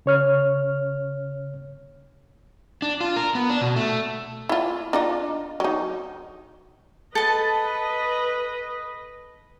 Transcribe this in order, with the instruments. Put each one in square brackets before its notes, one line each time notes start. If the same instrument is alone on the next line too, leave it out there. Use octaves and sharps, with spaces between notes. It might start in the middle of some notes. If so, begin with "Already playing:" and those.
[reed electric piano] C#3 C#5 F6
[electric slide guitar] D4
F4
A#4
B3
D4
B2
A3
[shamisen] E4 F4
D4 D#4 F4
F#3 D#4
[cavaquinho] A4 A5 [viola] B4 D#5